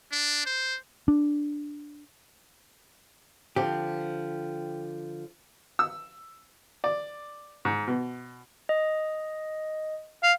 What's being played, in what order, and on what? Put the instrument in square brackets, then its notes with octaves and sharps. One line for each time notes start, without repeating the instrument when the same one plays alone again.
[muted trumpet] D4
C5
[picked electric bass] D4
[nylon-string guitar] D3 F3 C4 [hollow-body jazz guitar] G4
[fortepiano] E6
D5
G#2
B2
[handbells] D#5
[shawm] F5